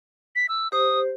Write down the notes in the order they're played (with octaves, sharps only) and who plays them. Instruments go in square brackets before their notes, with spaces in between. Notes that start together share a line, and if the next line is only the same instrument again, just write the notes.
[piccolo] B6
E6
[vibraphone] G4 C5 [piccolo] D#6